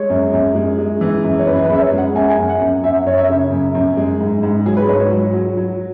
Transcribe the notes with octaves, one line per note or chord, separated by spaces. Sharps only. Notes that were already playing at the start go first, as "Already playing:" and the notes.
Already playing: G#3 C#5
F#2
F#2
G#3
G#3
E3
F#2
C#5
F#2 B4
G#4
B4
F#2
E5
C#5
G#3
F#5
F#2 G#5
F#5
G#5
F#2
F#5
F#2
F#2 E5
F#2 C#5
E5
C#3
F#2
F#2
G#3
G#2
G#2
F#3 G#4
B4
G#2 C#5
F#3
F#3
F#3